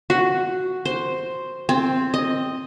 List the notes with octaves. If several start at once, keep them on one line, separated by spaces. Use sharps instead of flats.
F#4
C5
C4
D#5